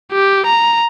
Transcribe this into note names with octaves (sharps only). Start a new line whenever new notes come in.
G4
A#5